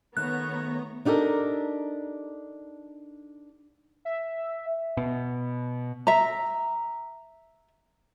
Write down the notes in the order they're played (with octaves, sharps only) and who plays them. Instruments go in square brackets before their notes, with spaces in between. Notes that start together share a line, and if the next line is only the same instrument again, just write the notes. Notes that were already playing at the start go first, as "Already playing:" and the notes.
[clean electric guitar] D#3 A3 [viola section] B3 C#5 A#5 [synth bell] F#6
[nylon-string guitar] D4 D#4 G4 A4 A#4
[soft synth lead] E5
[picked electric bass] B2
[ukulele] E5 A#5